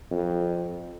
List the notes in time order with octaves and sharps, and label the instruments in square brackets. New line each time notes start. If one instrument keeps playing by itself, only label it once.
[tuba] F2